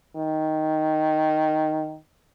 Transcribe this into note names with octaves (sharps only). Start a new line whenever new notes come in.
D#3